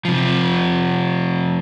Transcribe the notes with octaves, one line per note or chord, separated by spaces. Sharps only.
C3 F3